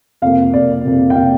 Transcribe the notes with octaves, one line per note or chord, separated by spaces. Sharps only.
F2 C3 A#3 F5
F2 C3 A#3 D5
F2 C3 A#3
G5
C3 A#3 F5